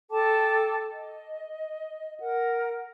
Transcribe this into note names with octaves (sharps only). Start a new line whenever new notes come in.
A4 G5 A5 D6
D#5
A#4 F#5